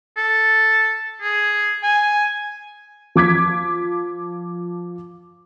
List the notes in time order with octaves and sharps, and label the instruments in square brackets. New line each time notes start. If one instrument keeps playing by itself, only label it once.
[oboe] A4
G#4
G#5
[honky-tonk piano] F3 D6 G#6 B6